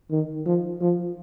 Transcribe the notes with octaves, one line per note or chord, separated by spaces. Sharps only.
D#3
F3
F3